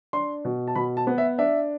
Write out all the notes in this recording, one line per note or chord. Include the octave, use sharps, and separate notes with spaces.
D4 C6
B2
A5
B2 B5
A5
B3
E5
D4 E5